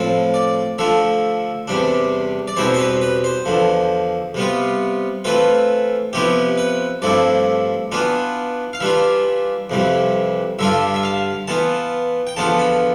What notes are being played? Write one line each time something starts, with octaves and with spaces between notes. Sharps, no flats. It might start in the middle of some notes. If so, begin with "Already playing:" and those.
Already playing: A2 F3 C4
D5
D3 F3 A3 E5
E2 C3 G3 D4
D5
E2 B2 G3 C4 E4 C5
C5
B4
B4
C5
E2 D3 F3
C3 G3 B3 F4
E3 A3 C4 F4 B4
C3 F3 B3 E4 G4
B4
G2 F3 A3 C4 E4 D5
E3 B3 D4 F4
F5
E3 G3 D4 F4 E5
F2 C3 E3 G3
G2 D3 G3 D4 F4 E5
E5
F5
E3 B3 F4 A5
G5
E2 D3 F3 B3 F4 A5
B5